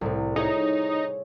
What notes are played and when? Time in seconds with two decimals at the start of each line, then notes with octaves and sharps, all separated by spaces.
0.01 C2 A2 C3
0.36 D#4 G#4 C#5 E5